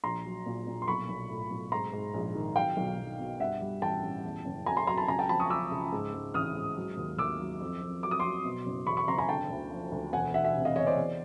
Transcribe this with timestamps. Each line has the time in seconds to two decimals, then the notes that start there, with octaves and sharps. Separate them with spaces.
0.04 A#1 A#5 C6
0.25 F#3
0.46 A#2
0.67 A#2
0.82 C6
0.88 B1 B5 C#6
1.09 B1
1.29 A2
1.50 B1
1.72 G#2 A#5 C6
1.93 G#2
2.14 A#1
2.35 D#3
2.56 F#3 F5 G5
2.77 B1
2.98 B1
3.19 B2
3.40 G2 E5 F#5
3.61 G3
3.82 A1 G5 A5
4.03 A1
4.24 E2
4.45 F#1
4.66 F#3 G#5 A#5
4.77 A#5 C6
4.87 F#3 A#5 C6
4.98 A5 B5
5.08 C#2 G#5 A#5
5.19 G5 A5
5.29 F3 A5 B5
5.40 C#6 D#6
5.50 F3 D6 E6
5.71 C#2
5.92 G#2
6.14 G#2
6.34 A1 D#6 F6
6.55 G#2
6.76 F#3
6.97 D#2
7.18 D#2 D6 E6
7.40 F#3
7.61 F2
7.82 F2
8.03 F#3 D6
8.11 D#6
8.20 F#3 C6 D6
8.45 B2
8.66 F#1
8.86 E2 B5 C#6
8.97 B5 C#6
9.08 F#1 A#5 C6
9.18 G#5 A#5
9.29 D3 G5 A5
9.50 D2
9.71 F3
9.92 D2
10.13 E1 F#5 G#5
10.34 E1 E5 F#5
10.44 E5 F#5
10.55 C3
10.65 D#5 F5
10.76 E2 C#5 D#5
10.87 C5 D5
10.97 E2